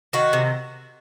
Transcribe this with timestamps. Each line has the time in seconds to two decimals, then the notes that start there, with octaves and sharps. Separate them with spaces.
0.13 D#3 F#4
0.33 C3